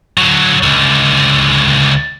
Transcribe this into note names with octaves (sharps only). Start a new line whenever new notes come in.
D3 F#3
C#2 D3